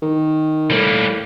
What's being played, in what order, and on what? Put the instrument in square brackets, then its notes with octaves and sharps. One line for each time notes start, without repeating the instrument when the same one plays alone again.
[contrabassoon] D#3
[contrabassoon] A2 [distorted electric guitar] G3 A#3